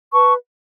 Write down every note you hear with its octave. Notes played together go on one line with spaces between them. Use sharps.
B4 A5 C#6